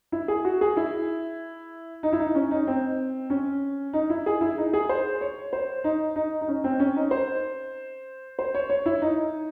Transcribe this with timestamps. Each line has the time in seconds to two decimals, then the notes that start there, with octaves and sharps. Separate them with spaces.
0.12 E4
0.28 G#4
0.45 F#4
0.61 G#4
0.77 E4
2.03 D#4
2.13 E4
2.19 D#4
2.35 C#4
2.51 D#4
2.67 C4
3.30 C#4
3.93 D#4
4.10 E4
4.26 G#4
4.41 E4
4.58 D#4
4.73 G#4
4.89 C5
5.21 C#5
5.53 C5
5.84 D#4
6.16 D#4
6.41 D#4
6.48 C#4
6.64 C4
6.80 C#4
6.96 D#4
7.11 C5
8.39 C5
8.55 C#5
8.70 C#5
8.86 E4
9.02 D#4